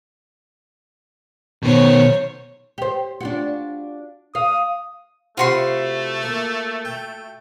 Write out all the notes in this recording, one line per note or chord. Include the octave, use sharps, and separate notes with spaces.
B2 D#3 C5 C#5
G4 C5
D4 F4 F#4
F5 D#6
C3 A3 F4 F#4 B5 C6
A#3
G5